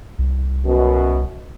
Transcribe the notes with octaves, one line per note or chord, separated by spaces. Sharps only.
C2
F#2 B2